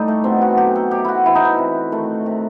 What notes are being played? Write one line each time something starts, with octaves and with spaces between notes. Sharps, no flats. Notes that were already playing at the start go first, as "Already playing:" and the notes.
Already playing: A2 G3 D#4 G4 A4
A3
B2 C4
F#4
F#3 G4
A4
C3 G4
E4 F#4
E3 E4
D#4
E4
C3
D#3 A3
C3